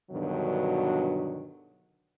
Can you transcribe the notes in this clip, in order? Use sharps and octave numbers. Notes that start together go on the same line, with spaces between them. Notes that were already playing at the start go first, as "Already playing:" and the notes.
G2 B2 D3 D#3 F#3